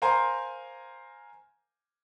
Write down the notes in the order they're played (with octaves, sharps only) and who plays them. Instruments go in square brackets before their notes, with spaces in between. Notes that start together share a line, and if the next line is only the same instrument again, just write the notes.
[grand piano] A#4 C5 F5 G#5 A#5 C6